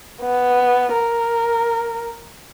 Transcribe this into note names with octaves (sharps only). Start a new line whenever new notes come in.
B3
A#4